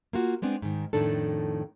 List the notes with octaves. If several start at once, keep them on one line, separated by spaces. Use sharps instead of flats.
A#3 F4 F#4
G#3 B3 C4 D4
G#2 D#3
F2 A2 D#3 D4 A4